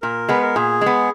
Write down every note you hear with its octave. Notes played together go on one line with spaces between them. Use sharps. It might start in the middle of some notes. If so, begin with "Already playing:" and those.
A#2 A#4
G#3 B3 B4
A#4
A#2 G#4
G#3 B3